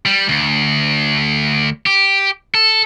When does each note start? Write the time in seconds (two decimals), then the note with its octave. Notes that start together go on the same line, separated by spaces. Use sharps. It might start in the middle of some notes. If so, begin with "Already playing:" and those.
0.06 G3
0.29 D2
1.86 G4
2.55 A4